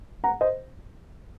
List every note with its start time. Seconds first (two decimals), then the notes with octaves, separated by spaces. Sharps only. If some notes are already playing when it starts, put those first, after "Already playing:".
0.24 F#5 A#5
0.41 C5 D#5